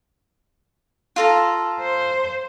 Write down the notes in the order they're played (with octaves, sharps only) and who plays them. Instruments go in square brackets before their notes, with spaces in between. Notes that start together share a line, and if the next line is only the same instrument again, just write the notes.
[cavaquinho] F4 A4 A#5
[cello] C5